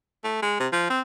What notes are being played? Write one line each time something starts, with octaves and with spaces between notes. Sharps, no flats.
A3
G#3
C3
F3
C4